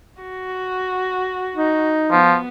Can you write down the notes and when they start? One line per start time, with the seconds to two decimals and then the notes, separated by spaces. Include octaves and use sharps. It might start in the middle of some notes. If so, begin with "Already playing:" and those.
0.21 F#4
1.55 D#4
2.11 F3 B3